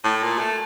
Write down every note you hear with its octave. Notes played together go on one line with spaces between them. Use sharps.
A2
A#2
A3